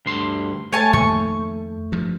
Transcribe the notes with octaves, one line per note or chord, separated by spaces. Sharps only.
D2 G2 C6
A3 C#5 G#5 A5
F2 D#3 A#3 C#6
G2 F3